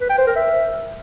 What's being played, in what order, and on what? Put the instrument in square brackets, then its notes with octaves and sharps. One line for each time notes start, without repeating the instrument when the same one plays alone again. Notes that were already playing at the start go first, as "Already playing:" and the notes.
[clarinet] B4
G5
C5
A#4
E5